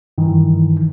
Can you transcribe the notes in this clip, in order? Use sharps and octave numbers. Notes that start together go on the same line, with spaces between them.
G2 D#3 E3